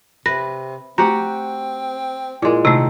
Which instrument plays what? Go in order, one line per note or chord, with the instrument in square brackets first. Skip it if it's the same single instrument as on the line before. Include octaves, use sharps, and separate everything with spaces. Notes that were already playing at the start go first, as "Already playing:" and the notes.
[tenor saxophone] C3 [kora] B4 [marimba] A#6
[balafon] A3 A#5 [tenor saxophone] C4 [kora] F#4 G4 F#5
[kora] A#2 G#3 [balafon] E4 A#4
[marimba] C3 A3 [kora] D#3